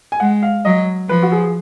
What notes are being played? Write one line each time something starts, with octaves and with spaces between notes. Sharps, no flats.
G#5
G#3 F#5
F5
F#3 D#5
F3 B4
F#4
G#4